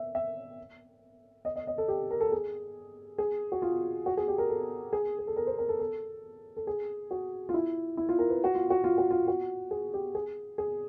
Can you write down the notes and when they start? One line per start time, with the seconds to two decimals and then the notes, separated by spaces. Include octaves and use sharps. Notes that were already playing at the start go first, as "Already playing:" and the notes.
Already playing: E5
0.15 E5
1.45 D#5
1.56 D#5
1.67 D#5
1.78 A4
1.88 G4
2.11 A#4
2.20 A4
2.32 G#4
3.18 G#4
3.52 F#4
3.62 F4
4.06 F#4
4.17 G#4
4.28 G4
4.38 A#4
4.49 A4
4.93 G#4
5.19 G#4
5.27 A4
5.36 A#4
5.47 C5
5.59 A#4
5.69 A4
5.79 A4
6.57 A4
6.67 G#4
7.11 F#4
7.49 F4
7.54 E4
7.97 E4
8.09 F4
8.19 A#4
8.30 B4
8.44 F#4
8.55 F4
8.70 F#4
8.84 F4
8.98 F#4
9.11 F4
9.28 F#4
9.71 G#4
9.94 G4
10.15 G#4
10.58 G#4